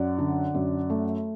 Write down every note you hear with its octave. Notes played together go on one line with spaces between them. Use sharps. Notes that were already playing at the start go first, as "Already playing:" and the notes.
Already playing: F#2 D5 F#5
D3
F#2
A3